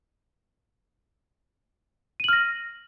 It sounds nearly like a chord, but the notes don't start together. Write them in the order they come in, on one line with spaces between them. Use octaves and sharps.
D#7 F#7 F6 A#6